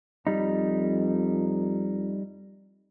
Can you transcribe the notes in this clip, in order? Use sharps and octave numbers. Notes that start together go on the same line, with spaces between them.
F2 G3 D#4